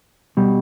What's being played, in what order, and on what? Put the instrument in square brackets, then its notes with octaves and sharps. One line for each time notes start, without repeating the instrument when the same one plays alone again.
[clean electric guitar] B2 G3